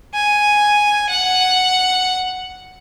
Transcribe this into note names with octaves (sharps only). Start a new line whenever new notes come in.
G#5
F#5